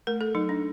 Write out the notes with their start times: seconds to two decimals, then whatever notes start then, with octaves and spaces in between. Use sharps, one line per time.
0.07 A3 A#4
0.21 A4
0.35 F#3 D#4
0.49 D4